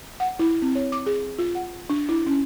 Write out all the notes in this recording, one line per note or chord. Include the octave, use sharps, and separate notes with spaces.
F#5
E4
C4
C#5
D6
G#4
F4
F#5
D4
E4
C#4